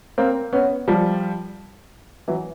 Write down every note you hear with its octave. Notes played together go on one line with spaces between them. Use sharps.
A#3 C4
B3 C#4
F3 G3
E3 F#3